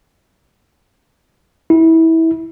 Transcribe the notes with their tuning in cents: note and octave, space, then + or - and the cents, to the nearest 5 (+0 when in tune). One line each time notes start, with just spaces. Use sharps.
E4 -25